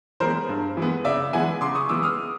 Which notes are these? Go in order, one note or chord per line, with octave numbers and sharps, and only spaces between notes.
E3 G#3 B3 A#4 C5
G2
E3 G#3 B3
C#3 D5 E5
E3 G#3 B3 F#5 G#5
C#3 C6 D6
C#6 D#6
E3 G#3 B3 D6 E6
D#6 F6